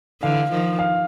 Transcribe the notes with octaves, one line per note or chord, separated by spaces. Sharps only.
D3 E3 F5
D#3 F3
F5